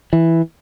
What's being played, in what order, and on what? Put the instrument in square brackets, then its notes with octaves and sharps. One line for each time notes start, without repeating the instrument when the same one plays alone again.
[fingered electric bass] E3